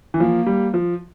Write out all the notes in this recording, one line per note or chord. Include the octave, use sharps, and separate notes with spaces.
E3
F3 A#3
G3
F3